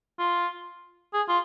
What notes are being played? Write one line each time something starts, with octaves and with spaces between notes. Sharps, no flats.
F4
G#4
F4